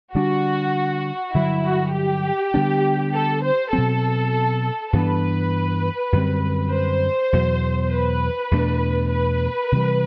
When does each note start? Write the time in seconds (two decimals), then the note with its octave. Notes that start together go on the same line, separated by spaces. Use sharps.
0.15 D3 G3 D4 F#4
1.34 G2 D3 F#3 E4
1.64 F#4
1.94 G4
2.54 D3 G3 B3 D4
3.13 A4
3.44 C5
3.73 B2 F#3 C4 A4
4.93 G2 E3 B3 D4 B4
6.12 F#2 D3 G3 C4
6.72 C5
7.33 E2 B2 F#3
7.92 B4
8.51 E2 B2 A3 D4
9.12 B4
9.72 C3 E3 G3